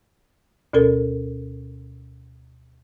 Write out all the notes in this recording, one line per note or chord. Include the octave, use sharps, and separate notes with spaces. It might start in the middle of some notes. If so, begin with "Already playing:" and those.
D2 B2 C#4 A4 A#4